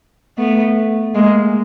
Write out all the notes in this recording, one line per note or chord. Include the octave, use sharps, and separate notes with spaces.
A3 B3
G#3 A#3